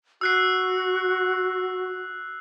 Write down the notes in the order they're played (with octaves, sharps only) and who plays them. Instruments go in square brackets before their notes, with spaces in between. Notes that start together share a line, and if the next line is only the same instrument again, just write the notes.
[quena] F#4 [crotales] E6 F#6 C7